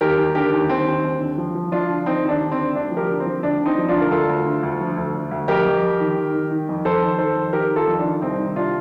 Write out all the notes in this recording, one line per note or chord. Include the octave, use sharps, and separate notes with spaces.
D#2 G4 A#4
D#2
D3 G4 A#4
D#2
D#2 C4
D#2
D#2
D3
F3
F3
F3 D4 F4
D3
D3 C4 D#4
D#2
D4
D3
C4
D3
D2 D4
F3
G4 A#4
D3
C4
F3
D2 D4
D3
C4 D#4
F3
D4 F4
D2
A#4
D2 F4 A4
D2
D3
D2
F3
D2
D3
D2
F2 G4 A#4
F2
F2
D#3
D#3
D#3
D#3
F2
F2 A4 C5
D#3
D#3 A4 C5
F2
D#3 G4 A#4
D#3
F4 A4
F2
D4 F4
D#3
C2 C4 D#4
D#3
C3 D4 F4